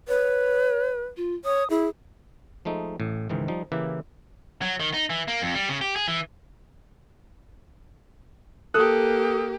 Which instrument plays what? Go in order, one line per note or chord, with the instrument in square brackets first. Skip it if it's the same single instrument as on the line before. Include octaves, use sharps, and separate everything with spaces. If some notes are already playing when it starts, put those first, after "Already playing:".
[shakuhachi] B4 [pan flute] C#5
[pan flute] F4
[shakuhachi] C#5 [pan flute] D#6
[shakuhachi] E4 [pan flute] G#4
[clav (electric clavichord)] F3 G#3 A3 D#4
A1 A2
C#2 G#2 D#3 E3 G#3
F3 G3 D#4
C#3 E3 A#3 E4 G4 B4
[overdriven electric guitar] F#3
D#3
D#4
E3
A#3
F2
G3
C#3
G4
G#4
E3
[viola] A#3 G4 [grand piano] A4 D#6 F#6